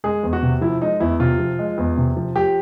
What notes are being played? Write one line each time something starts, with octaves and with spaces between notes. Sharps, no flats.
G#3 G#4
E2
F#4
C3
F3 E4
G#3 D#4
E2 E4
C3 F4
F3
G#3
E2
C3
F3
F3 G4